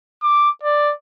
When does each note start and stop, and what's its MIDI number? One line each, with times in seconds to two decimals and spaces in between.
0.23 0.49 86
0.63 0.94 74